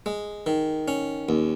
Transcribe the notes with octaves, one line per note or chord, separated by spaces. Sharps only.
G#3
D#3
C#4
D#2